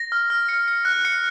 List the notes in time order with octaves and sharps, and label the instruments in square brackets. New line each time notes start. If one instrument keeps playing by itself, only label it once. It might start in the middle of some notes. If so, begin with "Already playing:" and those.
Already playing: [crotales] A#6
F6
F6
C#7
C#7
F#6
C#7